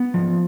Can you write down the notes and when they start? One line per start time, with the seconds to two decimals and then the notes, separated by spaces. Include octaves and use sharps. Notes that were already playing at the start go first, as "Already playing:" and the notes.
Already playing: B3
0.14 F3